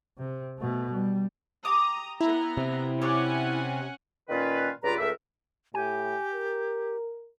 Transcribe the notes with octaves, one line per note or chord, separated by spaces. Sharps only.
C3
B2 A3
G3
G4 A#5 D6 D#6
B3 E4 A#5
C3
C#4 G4 C#5 D5 F#5 G#5
A#2 D#3 C#4 F4 B4
C#2 G2 F4 B4 D5 A#5
C#2 A3 A#4 E5
A2 G4 G#5
A#4